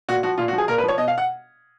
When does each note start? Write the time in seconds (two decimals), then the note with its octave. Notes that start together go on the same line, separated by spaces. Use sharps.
0.08 A#2 F#4
0.23 F3 F#4
0.38 A#2 F4
0.48 F#4
0.53 F3
0.58 G#4
0.68 A#2 A#4
0.78 B4
0.83 F3 C#5
0.98 B2 D#5
1.08 F5
1.18 F#5